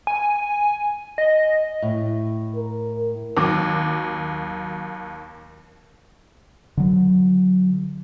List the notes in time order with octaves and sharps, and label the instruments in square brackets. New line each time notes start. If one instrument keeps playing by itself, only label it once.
[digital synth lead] G#5
D#5
[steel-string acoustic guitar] A2
[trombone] A#4
[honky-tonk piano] D#2 F#3 D6
[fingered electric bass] D3 F#3